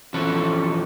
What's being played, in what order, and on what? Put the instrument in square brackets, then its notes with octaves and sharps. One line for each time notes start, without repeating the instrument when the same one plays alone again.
[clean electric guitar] E3 F3 C#4 A4 B4